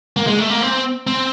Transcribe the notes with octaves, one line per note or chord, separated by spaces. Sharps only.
A#3
G#3
A3
A#3
C4
C4